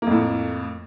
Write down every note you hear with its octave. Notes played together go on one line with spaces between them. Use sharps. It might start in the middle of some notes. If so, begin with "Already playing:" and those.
F2 A2 A#3